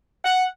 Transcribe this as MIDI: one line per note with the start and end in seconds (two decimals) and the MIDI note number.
0.25 0.46 78